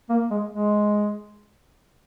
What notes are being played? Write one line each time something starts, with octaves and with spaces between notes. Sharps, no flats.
A#3
G#3
G#3